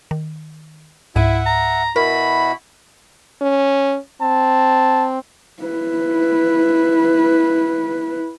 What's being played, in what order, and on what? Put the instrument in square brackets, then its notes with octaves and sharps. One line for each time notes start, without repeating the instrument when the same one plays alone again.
[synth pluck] D#3
[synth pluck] C#2 G#2 D#7 [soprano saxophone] E4 [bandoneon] E5 F#5
[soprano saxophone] A#5
[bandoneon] B2 E4 F#4 [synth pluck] A#4 [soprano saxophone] B5
[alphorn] C#4
[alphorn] C4 [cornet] A5
[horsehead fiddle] E4 B4